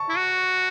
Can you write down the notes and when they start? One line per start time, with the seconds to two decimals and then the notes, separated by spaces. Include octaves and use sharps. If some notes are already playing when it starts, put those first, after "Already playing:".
Already playing: A5 C#6
0.09 E4
0.16 F#4